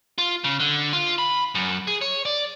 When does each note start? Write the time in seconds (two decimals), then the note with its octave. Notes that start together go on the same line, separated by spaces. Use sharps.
0.18 F4
0.44 C#3
0.60 D3
0.93 F4
1.18 B5
1.55 F#2
1.87 G#4
2.01 C#5
2.25 D5